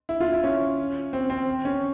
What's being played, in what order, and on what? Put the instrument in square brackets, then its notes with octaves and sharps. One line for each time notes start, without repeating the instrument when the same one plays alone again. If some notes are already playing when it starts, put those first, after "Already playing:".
[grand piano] E4
F4
E4
C#4
C4
C4
C#4